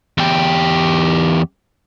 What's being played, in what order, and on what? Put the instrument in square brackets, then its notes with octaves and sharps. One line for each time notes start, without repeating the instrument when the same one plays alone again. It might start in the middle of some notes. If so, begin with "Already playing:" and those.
[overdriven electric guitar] E2 G4